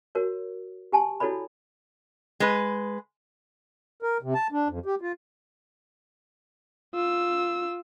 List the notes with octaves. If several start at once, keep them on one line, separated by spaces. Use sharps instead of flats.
F#4 A#4 C#5
G4 G#5 A5 C6
E4 F#4 A4 C#5 D5 B5
G#3 B4
A#4
C3
A5
D4
F2
G4
F4
F4 E6